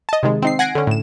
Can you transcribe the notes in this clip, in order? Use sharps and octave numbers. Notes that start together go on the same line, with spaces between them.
D#5 A5
C3 D#3 G#3
C4 D#4 C7
F#5 G#5 A#6 C7 D7
D3 C#4
A2 E7